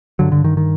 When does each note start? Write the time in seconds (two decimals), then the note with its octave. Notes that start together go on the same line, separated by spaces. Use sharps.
0.19 G2 D3 F#3
0.32 D3
0.44 D#3
0.57 D#3